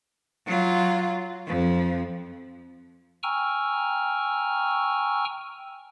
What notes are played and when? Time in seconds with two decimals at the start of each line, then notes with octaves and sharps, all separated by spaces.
0.47 F#3 F4
1.47 F2 F3
3.23 G5 G#5 A#5 C#6 E6 F6